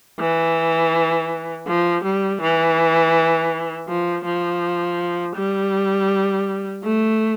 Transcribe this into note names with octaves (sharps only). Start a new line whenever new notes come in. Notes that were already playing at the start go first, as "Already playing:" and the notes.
E3
F3
G3
E3
F3
F3
G3
A3